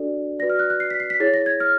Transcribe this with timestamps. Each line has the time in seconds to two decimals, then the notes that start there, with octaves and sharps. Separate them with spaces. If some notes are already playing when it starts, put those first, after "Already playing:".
Already playing: D4 F#4 A4 D5
0.39 F#4 B4 D5 A#6
0.50 F6
0.59 F#6
0.70 F#6
0.80 C7
0.90 B6
1.00 C7
1.10 B6
1.20 E4 G#4 C#5 A6
1.34 A#6
1.46 G#6
1.60 F6